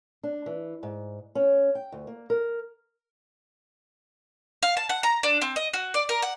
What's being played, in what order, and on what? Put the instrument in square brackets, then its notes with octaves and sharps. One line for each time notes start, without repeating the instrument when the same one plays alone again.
[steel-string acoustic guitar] D4
E3
G#2
C#4
G5
D2
A#3
A#4
[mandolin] F5
A5
F#5
A#5
D4
C4
D#5
F#4
D5
A#4
F#5